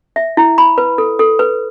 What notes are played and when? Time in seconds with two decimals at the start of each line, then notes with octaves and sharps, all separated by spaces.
0.16 E5
0.37 E4
0.58 B5
0.78 B4
0.98 A4
1.19 A4
1.39 B4